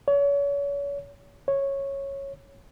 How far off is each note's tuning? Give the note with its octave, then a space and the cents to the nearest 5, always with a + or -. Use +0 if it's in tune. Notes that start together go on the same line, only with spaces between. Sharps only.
C#5 +35
C#5 -10